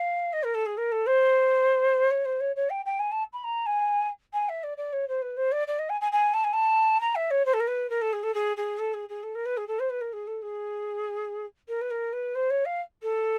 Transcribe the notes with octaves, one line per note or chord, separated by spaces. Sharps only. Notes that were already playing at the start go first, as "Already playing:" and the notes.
Already playing: F5
D#5
A#4
A4
G#4
A#4
A4
C5
C#5
C5
C#5
C#5
G5
G5
G#5
A5
B5
A#5
G#5
G#5
E5
D5
D5
C#5
C5
B4
C5
D5
D5
D#5
G#5
G#5
G#5
A5
G#5
A5
A#5
E5
C#5
C5
A4
A#4
B4
A#4
A4
G#4
A4
G#4
G#4
A4
G#4
G#4
A4
A#4
B4
G#4
A4
C5
B4
A#4
G#4
A4
G#4
A#4
B4
A#4
B4
C5
C#5
F5
A4